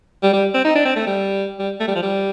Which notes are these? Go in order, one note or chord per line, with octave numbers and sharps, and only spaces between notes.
G3
G3
C4
D#4
D4
C4
A3
G3
G3
A3
G3
F3
G3